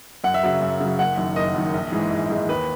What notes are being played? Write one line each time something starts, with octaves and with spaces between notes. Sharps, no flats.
F#2 F#5
E5
C#3 F#3 F#5
F#2
C#3 F#3
F#1 F#5
F#2 D#3
F#1 D#5
F#2 D#3
A#1
G#2 E3 G#3
A#1
G#2 E3 G#3
D#2 B4